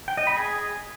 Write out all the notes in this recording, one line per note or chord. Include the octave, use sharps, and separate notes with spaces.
G5
D#5
B5
G#4